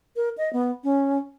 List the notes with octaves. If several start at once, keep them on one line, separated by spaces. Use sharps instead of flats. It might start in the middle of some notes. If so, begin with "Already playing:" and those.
A#4
D#5
B3
C#4